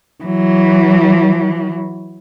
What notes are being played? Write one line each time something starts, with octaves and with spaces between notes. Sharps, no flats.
E3 F#3